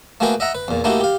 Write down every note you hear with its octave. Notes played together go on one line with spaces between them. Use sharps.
A3 A#3 F#4 G#4 B4 G5
D#5 E5 F#5 A#5
B4
E2 A#2
A3 A#3 D#4 E4 F#4 G4
G4 F5